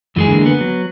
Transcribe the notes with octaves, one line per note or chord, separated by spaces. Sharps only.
F#2 E3 G#3 G#4
D3 A#3
B3
F#3